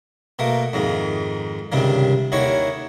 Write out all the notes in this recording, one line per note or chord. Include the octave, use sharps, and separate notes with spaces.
B2 A3 A#3
F2 G#2 D#3
C#2 G2 C3 D#3 G3
D#2 D3 D#3 E4 C#5 C#6